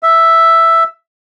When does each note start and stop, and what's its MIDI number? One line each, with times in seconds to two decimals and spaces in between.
0.03 0.84 76